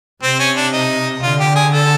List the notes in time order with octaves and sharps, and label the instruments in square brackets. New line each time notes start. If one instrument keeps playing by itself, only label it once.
[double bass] C3 [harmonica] C4
[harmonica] C#4
D4
D#4
[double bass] D3 [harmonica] F4
[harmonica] G4
G#4
A4